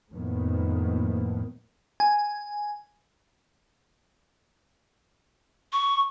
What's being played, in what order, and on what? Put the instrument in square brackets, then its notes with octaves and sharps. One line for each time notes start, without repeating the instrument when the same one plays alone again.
[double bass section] F2 A2 D#3 A#3 B3
[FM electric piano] G#5
[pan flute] C#6